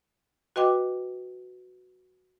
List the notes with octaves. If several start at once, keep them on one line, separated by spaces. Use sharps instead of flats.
F#4 B4 D#5 G5 D6